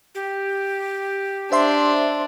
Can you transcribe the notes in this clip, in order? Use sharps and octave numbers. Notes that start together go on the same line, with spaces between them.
G4
D4 C5 E5 C6